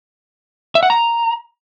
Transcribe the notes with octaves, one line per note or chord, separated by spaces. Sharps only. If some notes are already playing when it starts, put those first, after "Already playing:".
E5
F#5
A#5